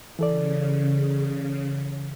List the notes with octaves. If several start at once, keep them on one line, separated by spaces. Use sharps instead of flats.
C#3 E3 A4 D5